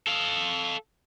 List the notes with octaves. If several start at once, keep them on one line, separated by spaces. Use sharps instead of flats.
A4 F5